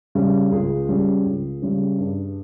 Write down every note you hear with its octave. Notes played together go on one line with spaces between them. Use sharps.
C#3 G3 C#4
C#2 G#4
C#3 G3 C#4
C#2
C#3 G3 C#4
G2